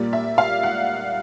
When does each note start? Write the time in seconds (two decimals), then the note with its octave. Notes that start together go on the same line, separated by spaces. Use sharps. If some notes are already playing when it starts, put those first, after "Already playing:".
Already playing: A#2 G3 A#3 D5
0.13 E5
0.38 F5
0.63 F#5